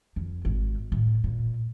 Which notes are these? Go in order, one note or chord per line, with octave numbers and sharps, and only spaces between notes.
F2
G#1
A2
A#2